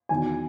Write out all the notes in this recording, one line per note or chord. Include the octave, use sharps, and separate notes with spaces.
E2 D#3 F#3 G#5